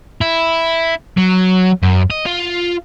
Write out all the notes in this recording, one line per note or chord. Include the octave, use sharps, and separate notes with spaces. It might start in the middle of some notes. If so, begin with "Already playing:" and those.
E4
F#3
F#2
D#5
F4